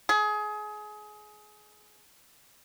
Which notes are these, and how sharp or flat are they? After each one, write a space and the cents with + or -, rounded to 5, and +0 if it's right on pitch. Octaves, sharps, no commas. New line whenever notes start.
G#4 +25